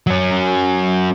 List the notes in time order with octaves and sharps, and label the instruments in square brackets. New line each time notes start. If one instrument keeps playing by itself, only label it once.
[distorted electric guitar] F#3 C#4